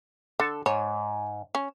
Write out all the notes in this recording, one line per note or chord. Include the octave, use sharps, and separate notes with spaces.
D3 A4
G#2 C#5
C#4